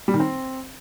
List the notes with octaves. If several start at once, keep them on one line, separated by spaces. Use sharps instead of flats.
G3
D#3
C4